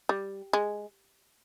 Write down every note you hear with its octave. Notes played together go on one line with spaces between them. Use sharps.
G3
G#3